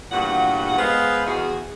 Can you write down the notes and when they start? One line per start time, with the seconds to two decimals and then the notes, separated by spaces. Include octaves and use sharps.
0.12 E2 G2 A#2 F#4 G4 F#5
0.78 G#3 B3 B4 C5 D#5 F5
1.26 E2 F#4 G#4